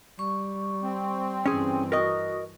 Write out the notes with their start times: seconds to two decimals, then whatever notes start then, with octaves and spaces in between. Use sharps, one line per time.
0.19 G3 C#6
0.83 C4
1.46 G2 E3 C#4 G#4
1.92 F#4 A#4 D#5 C#6 D#6